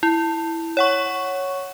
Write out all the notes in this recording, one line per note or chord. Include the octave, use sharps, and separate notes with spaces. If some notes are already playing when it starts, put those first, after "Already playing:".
E4
C#5 F#5 C#6